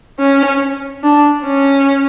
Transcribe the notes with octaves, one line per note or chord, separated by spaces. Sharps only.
C#4
D4
C#4